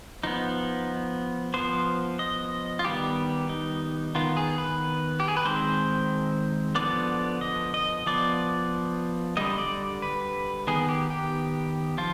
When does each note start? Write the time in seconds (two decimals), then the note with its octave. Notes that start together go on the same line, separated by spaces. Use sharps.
0.23 F3 B3 D#4
1.54 F3 B3 C5
2.19 D#5
2.79 F4
2.85 D#3 G3 B3 G4
3.49 D#4
4.15 D#3 B3 F4
4.37 G#4
4.58 B4
5.20 G4
5.28 G#4
5.37 B4
5.45 D#3 G#3 C4 C5
6.75 D3 F3 B3 D5
7.41 D#5
7.74 D#5
8.06 F3 B3 D5
9.37 D3 G3 B3 D#5
9.58 D5
10.02 B4
10.67 D#3 B3 G#4
10.89 G4
11.10 G4
11.98 F3 F4